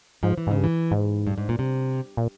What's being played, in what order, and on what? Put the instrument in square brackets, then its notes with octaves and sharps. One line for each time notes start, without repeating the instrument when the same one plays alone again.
[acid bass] G#2 [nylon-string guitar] F3
[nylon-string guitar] E3
[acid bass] G#2 [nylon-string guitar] C#3
[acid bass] G2
[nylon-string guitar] E3
[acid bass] G#2
[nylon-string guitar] G2
G#2
A#2
C3
[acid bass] A#2